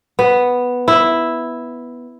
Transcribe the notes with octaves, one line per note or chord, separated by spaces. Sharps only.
B3
E4